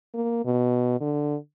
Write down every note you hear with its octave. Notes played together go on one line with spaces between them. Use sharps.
A#3
B2
D3